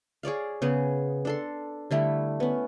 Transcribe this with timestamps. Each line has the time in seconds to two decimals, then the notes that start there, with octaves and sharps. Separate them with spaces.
0.23 G#4 C#5 D5 F5
0.62 C#3 B3 G#4
1.25 D4 A4 C6
1.91 D3 G3 A3 E4
2.40 B3 C#4